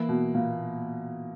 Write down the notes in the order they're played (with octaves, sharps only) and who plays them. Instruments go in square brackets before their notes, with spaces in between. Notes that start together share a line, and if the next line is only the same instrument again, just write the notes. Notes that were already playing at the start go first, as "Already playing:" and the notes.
Already playing: [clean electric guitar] E3 A#3 E4
[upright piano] B2
A#2